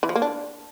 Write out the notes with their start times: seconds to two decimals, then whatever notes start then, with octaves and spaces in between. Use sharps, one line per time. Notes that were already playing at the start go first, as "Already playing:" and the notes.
0.03 E3
0.09 F3
0.15 A#3
0.22 D4